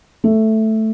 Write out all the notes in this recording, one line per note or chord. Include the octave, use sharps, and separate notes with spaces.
A3